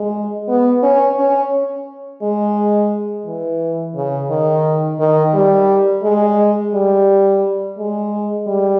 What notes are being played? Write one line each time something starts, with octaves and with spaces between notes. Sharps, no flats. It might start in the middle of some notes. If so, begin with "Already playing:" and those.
Already playing: G#3
B3
C#4
C#4
G#3
E3
C#3
D#3
D#3
G3
G#3
G3
G#3
G3